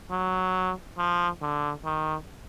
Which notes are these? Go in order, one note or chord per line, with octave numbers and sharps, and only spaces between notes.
F#3
F3
D3
D#3